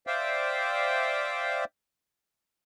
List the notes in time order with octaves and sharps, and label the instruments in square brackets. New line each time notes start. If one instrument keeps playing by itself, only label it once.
[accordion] C5 D5 E5 F5 G5